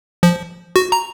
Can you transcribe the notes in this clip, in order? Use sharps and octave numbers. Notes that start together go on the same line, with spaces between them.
F3
F#4
A#5